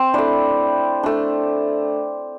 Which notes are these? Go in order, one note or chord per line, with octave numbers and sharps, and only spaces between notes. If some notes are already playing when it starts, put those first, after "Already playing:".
Already playing: C4 C5 E5
A3 D4 E4 D5
A3 D4